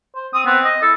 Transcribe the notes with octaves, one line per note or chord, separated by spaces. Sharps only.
C5
C4 D#6
B3 C4
D#5
E4 A4